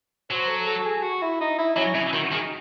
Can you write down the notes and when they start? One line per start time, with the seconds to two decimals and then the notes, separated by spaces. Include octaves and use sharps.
0.30 F#3 C5
0.48 A4
0.66 A4
0.85 G#4
1.03 F#4
1.22 E4
1.41 D#4
1.58 E4
1.77 F#3 C#4
1.95 C#3 E4
2.13 D#3 F#4
2.32 D#3 G#4
2.43 D#4